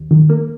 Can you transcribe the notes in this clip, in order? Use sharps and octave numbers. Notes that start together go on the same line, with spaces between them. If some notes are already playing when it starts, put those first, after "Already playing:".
Already playing: D#2
D#3
A#3